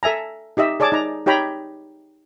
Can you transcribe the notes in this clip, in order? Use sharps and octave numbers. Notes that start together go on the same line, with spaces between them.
A4 E5 G#5 A#5
D#4 G4 D#5 E5
G#4 C#5 D5 A5 D6
D#4 A#5
D#4 G4 C#5 G5 A#5 B5